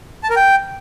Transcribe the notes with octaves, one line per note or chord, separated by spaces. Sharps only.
A5
A#4
G5